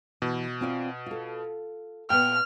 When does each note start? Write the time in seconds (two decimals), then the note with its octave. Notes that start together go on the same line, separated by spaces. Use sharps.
0.22 B2 E3
0.61 C4 F4 D5
1.06 F4 A4
2.10 A#2 B3 G5 F6